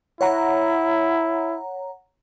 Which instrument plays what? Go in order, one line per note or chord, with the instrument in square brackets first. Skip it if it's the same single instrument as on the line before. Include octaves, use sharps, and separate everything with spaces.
[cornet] E4 [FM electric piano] C#5 F#5 A#5